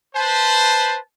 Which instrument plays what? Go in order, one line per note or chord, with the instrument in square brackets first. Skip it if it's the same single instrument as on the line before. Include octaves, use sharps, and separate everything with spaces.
[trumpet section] B4 C5 [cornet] A5